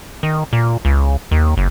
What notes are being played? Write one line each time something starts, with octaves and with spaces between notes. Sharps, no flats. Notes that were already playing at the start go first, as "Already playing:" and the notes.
D#3
A#2
C#2
D#2
F#1